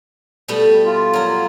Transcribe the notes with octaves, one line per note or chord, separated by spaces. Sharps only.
B2 G3 A3
F4
F#3 A#4